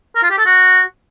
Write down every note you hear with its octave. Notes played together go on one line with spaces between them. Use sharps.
A#4
F4
G4
A4
F#4